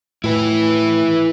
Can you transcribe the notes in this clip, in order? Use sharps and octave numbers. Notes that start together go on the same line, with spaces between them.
A2 E4 B4